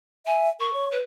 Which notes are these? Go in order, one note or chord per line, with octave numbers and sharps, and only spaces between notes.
E5 G#5
A#4 C#6
C#5
B4